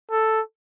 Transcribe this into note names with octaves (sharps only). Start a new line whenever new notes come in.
A4